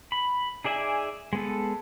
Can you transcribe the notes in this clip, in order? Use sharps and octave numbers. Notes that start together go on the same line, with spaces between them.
B5
D#4 G#4 D5 E5 G#5
G#3 B3 A4